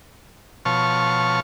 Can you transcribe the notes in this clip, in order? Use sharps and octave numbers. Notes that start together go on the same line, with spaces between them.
B2 F3 C#5 A5 C#6 F6